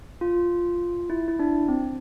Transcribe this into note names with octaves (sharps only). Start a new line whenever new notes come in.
F4
E4
E4
D4
C4